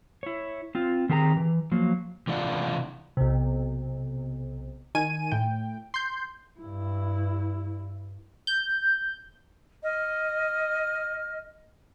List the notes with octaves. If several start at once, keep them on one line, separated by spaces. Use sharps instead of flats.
E4 C#5
C4 F4
D#3 C4 G4 G#4 G#5 A#5
E3
F3 F#3 A#3
C3 E3 G#3 D4 F4 F#5
B1 C3
D#3 G#5 D#7
A2 G5
C6 G6
G2 E4
G6
D#5 F6